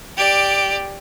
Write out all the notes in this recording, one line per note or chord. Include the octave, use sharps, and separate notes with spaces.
G4 D5